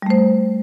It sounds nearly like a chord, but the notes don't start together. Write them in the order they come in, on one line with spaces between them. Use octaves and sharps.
G3 A3 C5